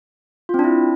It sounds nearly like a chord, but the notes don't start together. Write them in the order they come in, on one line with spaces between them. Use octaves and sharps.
F4 C4 D4 E4